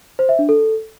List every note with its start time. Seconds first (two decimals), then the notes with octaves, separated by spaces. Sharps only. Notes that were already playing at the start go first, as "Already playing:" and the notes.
0.19 C5
0.29 E5
0.39 D4
0.49 A4